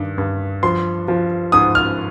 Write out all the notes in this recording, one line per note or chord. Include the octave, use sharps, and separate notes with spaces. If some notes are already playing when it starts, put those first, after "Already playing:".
Already playing: G2 D#3
G2
F3 C6
F3
G#2 D#6
F6